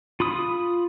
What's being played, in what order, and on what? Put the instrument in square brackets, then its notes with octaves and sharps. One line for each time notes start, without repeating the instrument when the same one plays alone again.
[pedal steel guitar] F4 B5 D#6